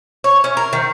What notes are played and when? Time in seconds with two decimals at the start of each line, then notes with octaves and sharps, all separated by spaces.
0.24 C#5
0.44 C#4
0.57 A#4
0.73 D#3